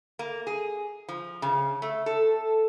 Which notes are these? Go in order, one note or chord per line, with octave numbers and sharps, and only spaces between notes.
A#3
G#4
F3
C#3
A3
A4